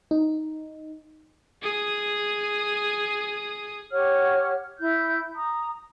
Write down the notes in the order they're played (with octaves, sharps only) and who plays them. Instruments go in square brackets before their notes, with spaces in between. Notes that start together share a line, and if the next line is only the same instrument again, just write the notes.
[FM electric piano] D#4
[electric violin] G#4 D#6
[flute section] G4 C#5 F#5 F6
E4 G6
A#5 D#6